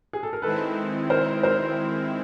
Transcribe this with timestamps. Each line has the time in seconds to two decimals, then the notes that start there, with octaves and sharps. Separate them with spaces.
0.13 G#4
0.23 A4
0.33 A#4
0.42 D#3 G#3 C4 E4 A4 B4
1.10 A#4 C5
1.43 A#4 C5